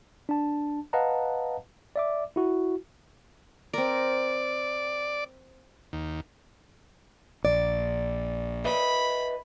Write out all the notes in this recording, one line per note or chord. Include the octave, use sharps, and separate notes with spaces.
D4 A5
B4 D#5 F5 F#5 A5 A#5
D5 E5 D6
E4 F#4
C4 A#4 D5
D#2
A#1 D5
B4 D#5 E5 B5